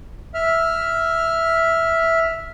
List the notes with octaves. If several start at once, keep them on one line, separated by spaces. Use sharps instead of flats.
E5 F6